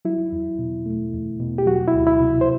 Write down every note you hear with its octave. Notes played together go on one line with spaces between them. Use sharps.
F#3 E4
E2
B2
A3
E2
B2
G4
F#3 F#4
E4
D2
E4
C3
C5